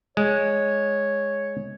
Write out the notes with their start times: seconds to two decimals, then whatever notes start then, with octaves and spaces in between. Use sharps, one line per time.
0.17 G#3 C#5